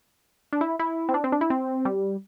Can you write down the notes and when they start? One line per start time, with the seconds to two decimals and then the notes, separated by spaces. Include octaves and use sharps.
0.53 D4
0.61 E4
0.79 E4
1.09 C4
1.14 D4
1.24 C4
1.32 D4
1.41 E4
1.50 C4
1.85 G3